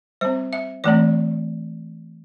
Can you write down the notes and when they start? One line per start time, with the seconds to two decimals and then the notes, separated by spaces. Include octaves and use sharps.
0.21 G3 C4 C5
0.53 E5
0.84 E3 A3 C4 D5